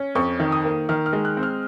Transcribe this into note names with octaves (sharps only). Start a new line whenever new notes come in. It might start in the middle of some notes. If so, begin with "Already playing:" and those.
Already playing: C#4
F2 C#6
D#3
D#6
A#3
D#3 F6
F6
G#3
F#6
C4
F6